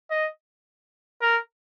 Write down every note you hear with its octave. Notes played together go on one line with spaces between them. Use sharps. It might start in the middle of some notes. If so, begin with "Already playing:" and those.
D#5
A#4